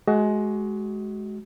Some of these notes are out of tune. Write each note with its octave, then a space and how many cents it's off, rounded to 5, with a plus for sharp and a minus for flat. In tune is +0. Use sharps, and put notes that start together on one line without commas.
G#3 +25 F#4 +25